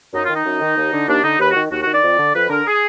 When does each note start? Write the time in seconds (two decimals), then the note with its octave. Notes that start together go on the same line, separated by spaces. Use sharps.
0.13 F#2 D#4
0.24 F4
0.29 D#3
0.34 D#4
0.45 F#2
0.61 D#3
0.77 D#2
0.93 D3
1.08 D#2 D4
1.24 D3 D#4
1.39 D#2 B4
1.51 F#4
1.56 D#3
1.71 D#2 F#4
1.82 D#3 F#4
1.93 D5
2.04 F2
2.19 D3
2.35 F2 B4
2.50 D3 A#4
2.66 G#4